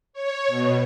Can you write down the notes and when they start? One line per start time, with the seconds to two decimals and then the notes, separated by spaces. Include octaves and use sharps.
0.13 C#5
0.48 B2